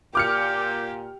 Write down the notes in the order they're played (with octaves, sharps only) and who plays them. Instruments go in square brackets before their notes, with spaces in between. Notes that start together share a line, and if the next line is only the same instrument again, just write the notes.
[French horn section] A#2 [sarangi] G4 [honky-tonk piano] D6 F6 C#7 [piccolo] G6